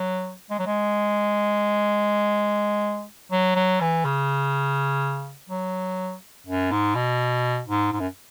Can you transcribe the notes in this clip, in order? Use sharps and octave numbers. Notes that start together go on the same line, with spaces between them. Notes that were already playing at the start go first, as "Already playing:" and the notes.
Already playing: F#3
G#3
F#3
G#3
F#3
F#3
E3
C#3
F#3
F#2
G#2
B2
G#2
G#2
F#2